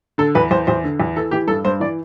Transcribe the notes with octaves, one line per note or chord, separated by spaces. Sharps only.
D3 A4
E2 B4
E2 C5
E2 C5
D3
E2
E3 A4
E3 G4
G2 A4
G2 C5
E3 D5